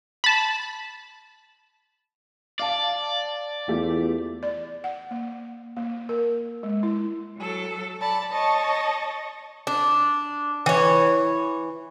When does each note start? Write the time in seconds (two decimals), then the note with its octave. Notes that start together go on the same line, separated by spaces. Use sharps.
0.24 A5 B5
2.59 D5 F5 A5
3.69 E2 A3 F4 G4
4.43 D5
4.84 F#5
5.11 A#3
5.77 A#3
6.09 A#4
6.63 G#3
6.83 E4
7.37 F#3 A4
7.99 D5 A5 B5
8.32 C#5 D#5 A5 C#6
9.67 D4
10.66 E3 C#5